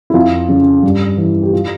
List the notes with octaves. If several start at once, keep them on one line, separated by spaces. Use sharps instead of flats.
E4
F2 F4
C#3 F3
G2
E3
G4
F4